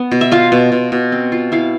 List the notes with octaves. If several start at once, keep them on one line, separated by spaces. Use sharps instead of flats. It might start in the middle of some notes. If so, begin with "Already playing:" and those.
Already playing: B3
B2
E5
F4 F5
B2
B2
B2
C4
F4
E4 F5